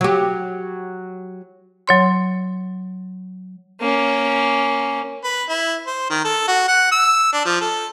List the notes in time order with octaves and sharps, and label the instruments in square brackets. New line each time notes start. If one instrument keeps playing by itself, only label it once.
[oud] F#3 G4
[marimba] F#3 C#5 C6
[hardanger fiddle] A#3 C#4
[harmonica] B4
E4
C5
D#3
A4
F#4
F#5
E6
D4
F3
A4